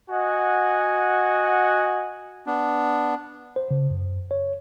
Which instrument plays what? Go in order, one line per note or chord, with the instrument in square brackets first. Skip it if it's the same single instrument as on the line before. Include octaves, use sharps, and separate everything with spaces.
[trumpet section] F#4 D#5 F#5 G#5
[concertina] B3 D4
[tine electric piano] C5
C#3
F#2
C#5